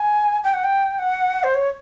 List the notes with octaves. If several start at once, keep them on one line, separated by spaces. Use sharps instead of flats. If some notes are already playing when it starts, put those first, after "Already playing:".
Already playing: G#5
G5
F#5
G5
F#5
C5
C#5